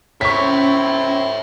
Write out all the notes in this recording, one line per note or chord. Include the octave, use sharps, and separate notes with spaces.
C4 C#4 E4 C#5 E5 C#6 B6